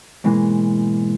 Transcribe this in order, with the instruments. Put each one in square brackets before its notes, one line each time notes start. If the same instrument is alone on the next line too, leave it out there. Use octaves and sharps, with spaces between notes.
[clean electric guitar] G#2 B2 E3 G#3 A#3